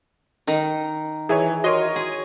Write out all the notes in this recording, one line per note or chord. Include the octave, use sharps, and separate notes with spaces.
D#3 D#4
E3 G#4 C#5 E5 G#5
F#4 A#4 C#5 D#5 C6 D#7
G#4